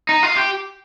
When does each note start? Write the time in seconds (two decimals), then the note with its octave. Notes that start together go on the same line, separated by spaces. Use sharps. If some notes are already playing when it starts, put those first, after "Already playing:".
0.09 D#4
0.23 F4
0.37 G4